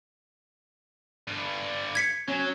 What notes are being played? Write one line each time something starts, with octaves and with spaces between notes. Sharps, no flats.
G2 D3
G#6 B6 C#7
F#3 C#4